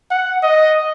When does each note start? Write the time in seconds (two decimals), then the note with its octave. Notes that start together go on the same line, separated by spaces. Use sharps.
0.10 F#5
0.43 D#5